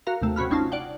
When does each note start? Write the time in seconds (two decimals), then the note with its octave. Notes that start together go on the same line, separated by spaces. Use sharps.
0.07 F#4 A#4 F5 A#5
0.22 D#2 C3 A3
0.36 C3 C#4 F#4 B5 F6
0.50 G1 C3 C#4 D#4 F4 A5
0.72 D5 F#5 G5